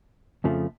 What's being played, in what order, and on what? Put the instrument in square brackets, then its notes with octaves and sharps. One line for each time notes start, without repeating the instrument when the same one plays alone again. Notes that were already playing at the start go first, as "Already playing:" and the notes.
[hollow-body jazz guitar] F2 C#3 F3 A3